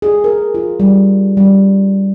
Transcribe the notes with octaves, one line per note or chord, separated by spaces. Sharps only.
G#4
A#4
F4
G3
G3